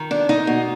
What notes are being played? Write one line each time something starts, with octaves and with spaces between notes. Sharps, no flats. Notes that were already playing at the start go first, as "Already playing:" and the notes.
Already playing: D#3
D4
D#4
B2